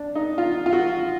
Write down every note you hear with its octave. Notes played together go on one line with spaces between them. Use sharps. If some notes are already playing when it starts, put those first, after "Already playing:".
Already playing: D4
D#4
F4
F4
F#4